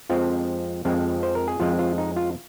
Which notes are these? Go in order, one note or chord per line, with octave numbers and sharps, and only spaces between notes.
F2 F3 G#3 C4 F4
F2 F3 G#3 C4
C5
A#4
G#4
F2 F3 G#3 C4 F4
F4
D#4
F4